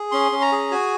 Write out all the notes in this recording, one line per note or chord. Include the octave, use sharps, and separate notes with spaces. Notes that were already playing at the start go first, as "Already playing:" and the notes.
Already playing: G#4
C#4 C6
C#4
A#5
G#4
F#4 G#5